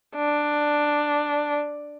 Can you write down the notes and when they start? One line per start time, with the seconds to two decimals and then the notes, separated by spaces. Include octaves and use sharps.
0.15 D4